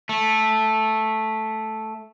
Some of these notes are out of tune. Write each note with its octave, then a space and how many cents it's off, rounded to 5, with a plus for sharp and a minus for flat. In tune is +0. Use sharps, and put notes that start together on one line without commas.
A3 -5